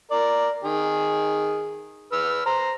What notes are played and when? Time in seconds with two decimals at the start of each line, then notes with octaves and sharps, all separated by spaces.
0.11 A#4 D5
0.64 D#3 G#4
2.12 B4 E6 F6
2.46 C5 A#5